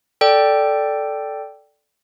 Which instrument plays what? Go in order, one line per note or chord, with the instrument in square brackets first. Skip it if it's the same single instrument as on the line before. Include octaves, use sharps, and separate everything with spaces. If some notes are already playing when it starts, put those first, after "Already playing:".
[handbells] A4 D5 G5